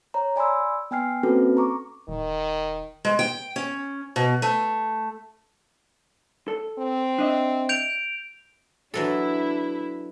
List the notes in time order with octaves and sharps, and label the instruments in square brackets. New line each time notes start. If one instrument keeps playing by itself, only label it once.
[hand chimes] C#5 A#5
D5 G#5 B5 C6 E6
B3 G5 G#5 F6 C7
A#3 C4 C#4 F#4 A4 B4
A#5 C#6 D6
[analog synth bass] D#1 [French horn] D#3
[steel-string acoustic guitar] G#3
G5
C#4
B2
A3
[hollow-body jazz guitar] A4
[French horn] C4
[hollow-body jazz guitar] D4 D#5 E5
[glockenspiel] G6 D7 F7
[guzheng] E3 F#3 A4 [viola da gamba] D4 E4